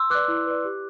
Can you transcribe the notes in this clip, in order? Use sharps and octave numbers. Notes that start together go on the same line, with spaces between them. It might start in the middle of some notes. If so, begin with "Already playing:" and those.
Already playing: C6 E6
B4 D5 D6 F#6
E4
B4 D5
G4